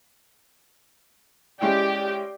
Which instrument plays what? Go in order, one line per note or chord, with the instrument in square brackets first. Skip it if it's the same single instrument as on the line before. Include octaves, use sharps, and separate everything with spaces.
[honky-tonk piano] G#3 C#4 E4 [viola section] G4 [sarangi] D5 [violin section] G5